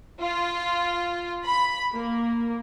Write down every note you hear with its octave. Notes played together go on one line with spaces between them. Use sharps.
F4
B5
A#3